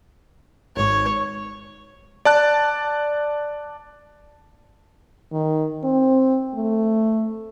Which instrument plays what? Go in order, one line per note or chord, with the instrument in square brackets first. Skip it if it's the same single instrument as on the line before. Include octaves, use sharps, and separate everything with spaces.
[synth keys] G#1 G#2 [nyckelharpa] C#5
[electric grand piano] D5 A5 F#6
[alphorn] D#3
C4
A3